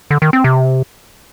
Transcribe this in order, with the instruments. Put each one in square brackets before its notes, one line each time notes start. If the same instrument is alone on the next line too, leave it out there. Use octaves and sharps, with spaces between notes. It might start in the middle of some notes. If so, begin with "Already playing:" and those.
[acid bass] D3
D#3
C4
C3